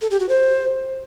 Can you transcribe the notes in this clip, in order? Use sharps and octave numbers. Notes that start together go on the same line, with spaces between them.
A4
G4
F#4
C5